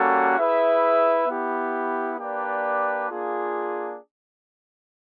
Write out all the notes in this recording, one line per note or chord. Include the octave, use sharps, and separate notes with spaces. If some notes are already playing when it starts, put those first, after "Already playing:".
Already playing: G3 A#3 C#4 F#4 A4
E4 G#4 B4 E5
B3 E4 G4
A#3 D4 G4 B4 D5
A#3 D4 F4 G#4